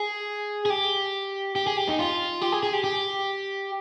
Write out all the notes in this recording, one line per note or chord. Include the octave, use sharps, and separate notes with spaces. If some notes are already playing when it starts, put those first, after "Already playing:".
Already playing: G#4
G#4
G4
G4
G#4
G4
D#4
F4
G4
G#4
G#4
G4
G4